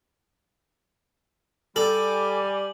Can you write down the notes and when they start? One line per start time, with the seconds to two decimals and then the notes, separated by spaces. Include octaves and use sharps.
1.76 G3 A4 G#5 D6 F#7